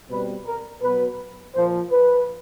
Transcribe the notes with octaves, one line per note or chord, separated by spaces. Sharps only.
B2 G3 C4 B4
A#4
B2 F#3 B3 B4
A#2 F3 A#3 C5
B4